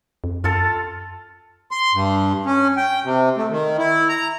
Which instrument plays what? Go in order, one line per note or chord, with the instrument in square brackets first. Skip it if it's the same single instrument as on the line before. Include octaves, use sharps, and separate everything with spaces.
[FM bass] F2
[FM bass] F#2 [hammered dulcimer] F4 A4
[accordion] C6
G2
C#4
G5
C3
A3
D#3
E4
A#5